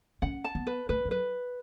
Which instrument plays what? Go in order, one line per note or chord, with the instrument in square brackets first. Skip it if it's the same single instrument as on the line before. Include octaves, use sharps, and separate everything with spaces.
[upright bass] C#4 [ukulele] F#5
[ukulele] A5
[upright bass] B3
[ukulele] B4
[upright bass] A3 [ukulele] B4
[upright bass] F#3
[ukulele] B4